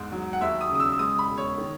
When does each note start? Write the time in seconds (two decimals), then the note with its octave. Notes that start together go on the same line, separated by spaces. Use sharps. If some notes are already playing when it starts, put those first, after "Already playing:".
Already playing: E2 G#2
0.12 F#3
0.33 F#5
0.41 D#2 E5
0.61 D#6
0.70 C#3
0.75 D#6
0.80 E6
0.92 E6
0.99 G#3 D#6
1.19 B5
1.28 E1
1.38 C#5
1.57 D#3